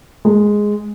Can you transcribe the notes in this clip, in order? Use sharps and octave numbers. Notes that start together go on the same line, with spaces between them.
G#3